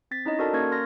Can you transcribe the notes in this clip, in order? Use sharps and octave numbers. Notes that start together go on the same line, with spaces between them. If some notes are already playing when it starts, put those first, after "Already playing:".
C4 A6 B6
C#4 D#4 E4 C#5 D#5
F#4 A4 A#4 D5 A5
A#3 C#4 A#4 C#6 G#6
C6 F6 A6 A#6